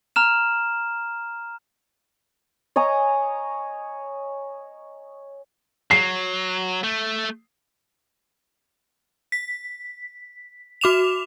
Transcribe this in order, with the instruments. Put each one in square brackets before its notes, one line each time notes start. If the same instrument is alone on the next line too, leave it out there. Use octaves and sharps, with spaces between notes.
[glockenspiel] A#5 F6 E7
[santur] C#5 D#5 G#5 A#5
[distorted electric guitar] F#3 [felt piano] C7
[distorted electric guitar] A3
[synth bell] B6
F#4 D6 E7 F7